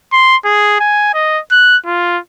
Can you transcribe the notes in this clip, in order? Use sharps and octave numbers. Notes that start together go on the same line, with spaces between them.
C6
G#4
G#5
D#5
F#6
F4